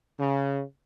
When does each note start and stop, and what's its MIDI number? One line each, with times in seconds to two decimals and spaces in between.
0.19 0.61 49